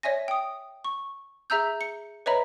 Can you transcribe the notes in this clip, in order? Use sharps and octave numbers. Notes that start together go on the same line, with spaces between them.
C#5 D5 E5 G#5 A#6
G5 D#6
C#6
G#4 E5 A#5 E6 G6
C#7
B4 C#5 D#5 E5 A#5 B5